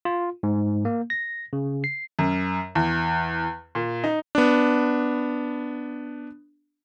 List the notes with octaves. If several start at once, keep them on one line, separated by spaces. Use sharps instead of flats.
F4
G#2
A#3
A#6
C#3
C7
F#2
E2
A#2
D#4
B3 D4